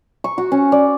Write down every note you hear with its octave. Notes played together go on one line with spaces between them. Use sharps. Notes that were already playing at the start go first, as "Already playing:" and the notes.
C#6
F#4
C#4
D5